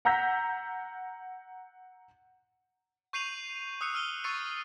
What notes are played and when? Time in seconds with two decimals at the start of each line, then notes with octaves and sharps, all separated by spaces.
0.05 F#5 A#5 E6 G6 A#6 B6
3.13 C#6 G6 C7 D#7 F7 F#7
3.81 D#6 E6 F#6 C7 C#7
3.94 E6 F6 D#7 G7
4.24 C#6 E6 A6 C7 C#7 D#7